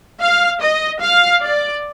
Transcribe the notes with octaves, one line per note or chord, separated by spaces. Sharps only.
F5
D#5
F5
D5